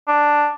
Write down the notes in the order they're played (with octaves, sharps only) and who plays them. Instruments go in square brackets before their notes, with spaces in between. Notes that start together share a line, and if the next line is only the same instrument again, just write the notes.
[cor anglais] D4